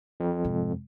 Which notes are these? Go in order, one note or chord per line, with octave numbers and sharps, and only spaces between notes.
F2
C2 G#2